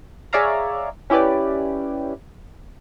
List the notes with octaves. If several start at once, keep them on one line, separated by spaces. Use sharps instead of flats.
G#4 C#5 D5 E5 F5 A#5
C#4 E4 G4 B4 D5